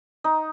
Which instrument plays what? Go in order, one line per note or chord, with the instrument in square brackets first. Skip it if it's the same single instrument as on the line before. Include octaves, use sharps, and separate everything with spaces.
[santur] D#4